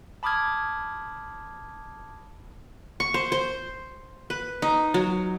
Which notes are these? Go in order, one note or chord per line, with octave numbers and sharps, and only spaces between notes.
A5 B5 D6 D#6 F6 G#6
C#6
C5
C5
B4
D#4
F#3